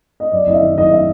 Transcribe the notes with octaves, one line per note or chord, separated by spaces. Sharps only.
D#5
F#2 D5
F#1 D#5
E5
D#3
F#1 D#5
E5